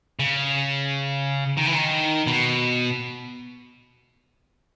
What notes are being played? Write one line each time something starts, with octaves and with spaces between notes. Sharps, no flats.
C#3
D#3
E3
D#3
B2